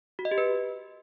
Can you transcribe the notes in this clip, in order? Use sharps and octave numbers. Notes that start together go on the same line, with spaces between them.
F#4
D#5
G4
B4